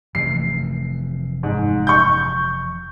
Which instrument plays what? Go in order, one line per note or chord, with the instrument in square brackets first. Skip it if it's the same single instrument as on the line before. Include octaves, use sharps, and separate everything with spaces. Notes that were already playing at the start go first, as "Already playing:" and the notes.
[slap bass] F1 E3 A3 [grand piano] C7
[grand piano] G#2
C#6 G6